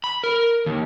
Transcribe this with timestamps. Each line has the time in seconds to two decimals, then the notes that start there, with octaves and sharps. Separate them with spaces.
0.04 B5
0.24 A#4
0.66 D#2